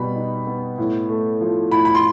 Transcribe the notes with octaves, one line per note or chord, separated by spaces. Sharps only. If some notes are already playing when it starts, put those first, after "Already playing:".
Already playing: B2 G3 B3 B5
D#4
B3
A2
A3
F3
A2 B5
B5
C6